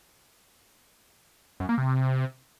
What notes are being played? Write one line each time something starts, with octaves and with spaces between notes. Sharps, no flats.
F#2
A#3
C3